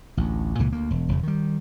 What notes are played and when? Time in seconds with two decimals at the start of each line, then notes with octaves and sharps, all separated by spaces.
0.17 A1 D2
0.59 C#2 A#2 C#3 E3
0.72 D2 A#3
0.91 E1
1.09 E1 C#3
1.23 D#3 G3